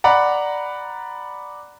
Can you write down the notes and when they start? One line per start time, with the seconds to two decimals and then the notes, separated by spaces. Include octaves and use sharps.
0.04 D5 F#5 A#5 B5